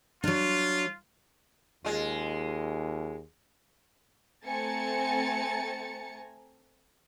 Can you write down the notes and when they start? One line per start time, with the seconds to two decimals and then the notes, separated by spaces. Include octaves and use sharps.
0.24 F#3 D4 F4
1.85 D#2 G#3 F4
4.45 A3 C4 G#5 A#5 A6 C#7